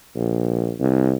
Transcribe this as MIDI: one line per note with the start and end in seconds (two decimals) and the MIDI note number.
0.16 0.73 34
0.80 1.15 36